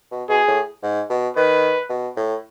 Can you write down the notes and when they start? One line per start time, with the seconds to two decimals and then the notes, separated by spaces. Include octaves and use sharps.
0.11 B2
0.29 B2 G#4
0.47 A2
0.82 G#2
1.10 B2
1.36 D#3 B4
1.89 B2
2.16 A2